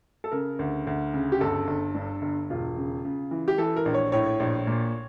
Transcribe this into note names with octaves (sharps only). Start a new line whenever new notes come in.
A4
C#3 A#4
D2
D2
C#3
G4
G1 A4
G1
G2
G1
E1 F4
C#3
C#3
E3
G4
E3 A4
A#4
A#1
C#5
A2 C#5
A#1
A#2